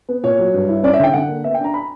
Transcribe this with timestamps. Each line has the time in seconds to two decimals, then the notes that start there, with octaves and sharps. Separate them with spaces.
0.09 B3
0.23 A#2 C#5
0.39 F#3
0.54 G2
0.69 E4
0.83 C#4 D5
0.93 E5
0.99 D3 G5
1.13 D3 F#5
1.28 A#3
1.44 B3 E5
1.54 G5
1.60 D4 A#5
1.74 B5